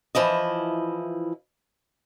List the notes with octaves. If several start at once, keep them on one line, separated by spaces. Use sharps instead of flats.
E3 F3 E4 D#5